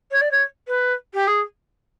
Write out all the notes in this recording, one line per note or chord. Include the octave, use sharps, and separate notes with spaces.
C#5
D5
C#5
B4
G4
G#4